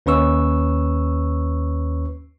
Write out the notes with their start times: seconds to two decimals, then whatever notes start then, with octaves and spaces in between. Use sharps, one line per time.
0.06 D#2 C#4 B4 C#6 E6